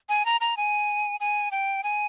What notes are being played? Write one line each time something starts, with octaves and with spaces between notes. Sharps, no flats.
G#5
A#5
A#5
G#5
G#5
G5
G#5